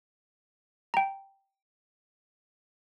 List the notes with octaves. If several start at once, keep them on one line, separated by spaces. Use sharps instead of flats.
G5 A#5